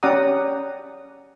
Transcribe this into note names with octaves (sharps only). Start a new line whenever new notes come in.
C#4 G4 D5 F#5 A#5 D#6